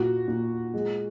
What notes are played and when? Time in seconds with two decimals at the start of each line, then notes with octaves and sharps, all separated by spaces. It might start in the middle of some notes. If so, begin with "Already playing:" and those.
Already playing: A#2 F#4
0.28 A#2
0.74 G#3